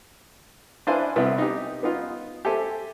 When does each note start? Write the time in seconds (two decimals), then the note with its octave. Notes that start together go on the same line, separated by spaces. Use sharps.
0.87 D4 E4 B4 C5 F5 G#5
1.16 C2 B3 C4 E4
1.38 D#4 G4
1.83 B3 D#4 F4
2.45 G4 A4 C5 E5 G#5